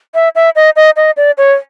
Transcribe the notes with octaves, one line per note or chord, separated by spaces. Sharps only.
E5
E5
D#5
D#5
D#5
D5
C#5